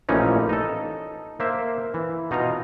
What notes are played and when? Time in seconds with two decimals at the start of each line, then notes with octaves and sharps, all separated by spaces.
0.09 A1 A#2 E3 F3 C#4 D#4
0.49 D#4 A4
1.40 A#3 C5 E5
1.94 E3
2.31 B2 D#4 F4 A#5